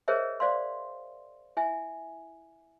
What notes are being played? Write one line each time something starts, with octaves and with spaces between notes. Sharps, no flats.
G#4 A#4 C5 C#5 D#5 E5
C5 D5 F5 C6
E4 E5 G#5